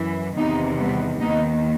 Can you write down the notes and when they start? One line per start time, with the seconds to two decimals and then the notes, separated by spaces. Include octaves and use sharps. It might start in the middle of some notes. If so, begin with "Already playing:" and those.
Already playing: F#2 E3
0.37 E2 C3 D#3 B3 D#4
0.78 G3 B3
1.20 D#2 D#3 B3 D#4